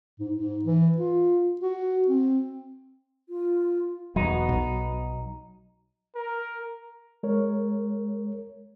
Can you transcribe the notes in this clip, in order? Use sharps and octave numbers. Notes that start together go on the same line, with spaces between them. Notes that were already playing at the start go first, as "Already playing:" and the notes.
G#2
G#2
E3
F4
F#4
C4
F4
E1 F#3 B3 D#4
B1
A#4
G#3 A#4 C#5